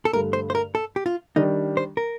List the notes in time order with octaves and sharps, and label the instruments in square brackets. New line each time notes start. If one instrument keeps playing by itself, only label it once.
[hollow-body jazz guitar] A4
[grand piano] G2 D3 A3 [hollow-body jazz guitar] A#4
[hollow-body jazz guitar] C5
C5
A#4
A4
G4
F4
[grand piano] D#3 G3 D4 [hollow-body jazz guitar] D#4
[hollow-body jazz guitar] C5
A#4